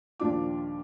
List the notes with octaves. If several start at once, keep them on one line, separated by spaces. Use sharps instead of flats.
D#2 A#2 F3 D4 F4 D6